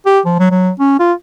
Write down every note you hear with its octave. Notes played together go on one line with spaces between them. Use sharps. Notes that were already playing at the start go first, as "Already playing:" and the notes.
G4
F3
F#3
F#3
C#4
F4